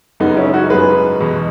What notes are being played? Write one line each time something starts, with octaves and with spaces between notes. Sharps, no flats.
F#2 C#3 G#3 B3 D#4
C#4 E4
D#4 F#4
F#2 C#3 G#3 G#4 B4
E2 B2 G#3